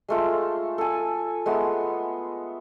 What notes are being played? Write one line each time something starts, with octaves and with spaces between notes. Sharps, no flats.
G#3 A3 F4
A4 G#5
G#3 A3 B3